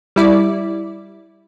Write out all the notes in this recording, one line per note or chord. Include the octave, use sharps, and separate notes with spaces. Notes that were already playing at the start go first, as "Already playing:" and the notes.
G3 E4 D5